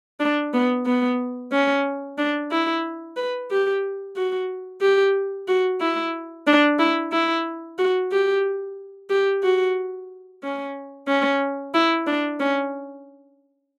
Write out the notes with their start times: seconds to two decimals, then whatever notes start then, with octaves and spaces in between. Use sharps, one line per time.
0.20 D4
0.54 B3
0.86 B3
1.52 C#4
2.18 D4
2.51 E4
3.17 B4
3.50 G4
4.16 F#4
4.81 G4
5.48 F#4
5.81 E4
6.47 D4
6.79 E4
7.13 E4
7.78 F#4
8.12 G4
9.10 G4
9.43 F#4
10.43 C#4
11.08 C#4
11.74 E4
12.07 D4
12.40 C#4